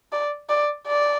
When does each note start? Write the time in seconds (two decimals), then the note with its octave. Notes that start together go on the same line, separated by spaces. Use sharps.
0.12 D5
0.49 D5
0.87 D5